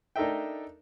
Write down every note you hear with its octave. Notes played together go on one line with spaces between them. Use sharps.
D4 D#4 A4 A#4 E5 G5